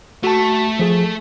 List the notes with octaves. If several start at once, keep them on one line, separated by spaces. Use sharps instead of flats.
A3 F#4 A5
F3 G#4